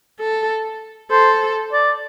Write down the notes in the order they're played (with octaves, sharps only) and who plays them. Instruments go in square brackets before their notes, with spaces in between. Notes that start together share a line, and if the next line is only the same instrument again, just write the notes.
[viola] A4
[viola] A4 [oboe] C5
[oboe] D5